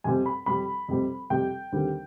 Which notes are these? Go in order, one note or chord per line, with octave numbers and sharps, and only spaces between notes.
F2 C3 G3 C4 G#5
B5
F2 C3 G3 C4 B5
F2 C3 G3 C4
F2 C3 G3 C4 G5
D#2 D3 G3 C4